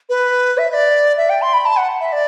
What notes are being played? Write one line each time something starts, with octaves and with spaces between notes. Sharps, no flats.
B4
E5
E5
D5
E5
G5
C6
B5
A5
F#5
E5
D5